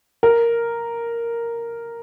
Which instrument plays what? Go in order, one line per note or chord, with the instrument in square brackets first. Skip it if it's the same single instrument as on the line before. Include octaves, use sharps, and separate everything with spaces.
[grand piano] A#4